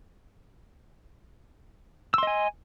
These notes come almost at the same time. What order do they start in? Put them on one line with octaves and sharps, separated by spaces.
E6 C6 D#5 G#5